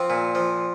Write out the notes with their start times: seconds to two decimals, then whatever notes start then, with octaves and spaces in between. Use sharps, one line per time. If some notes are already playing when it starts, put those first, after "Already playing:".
Already playing: F3 C4
0.10 A#2
0.35 F3